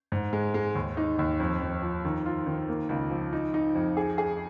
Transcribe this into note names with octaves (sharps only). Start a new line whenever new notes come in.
G#2
G#3
G#3
D#2
D#4
D#2
F2
F2
F3
D#3
F4
D#3
A#3
C#2
F3
D#4
D#4
F2
G#4
G#4